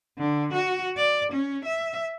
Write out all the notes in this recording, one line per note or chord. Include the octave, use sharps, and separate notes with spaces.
D3
F#4
D5
C#4
E5